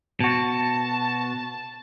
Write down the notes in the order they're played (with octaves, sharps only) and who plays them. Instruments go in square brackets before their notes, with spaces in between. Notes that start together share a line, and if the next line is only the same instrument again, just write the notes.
[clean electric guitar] B2 F#4 [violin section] A5